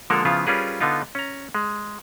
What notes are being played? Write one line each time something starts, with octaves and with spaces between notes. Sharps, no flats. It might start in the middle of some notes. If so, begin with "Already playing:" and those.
D3 F3 G#3 A#3 A4 A#4
C#3 F3 B3 E4 F4
G3 C#4 F4 G#4 A#4 B4
D3 B3 D#4 F4
C#4 A#5
G#3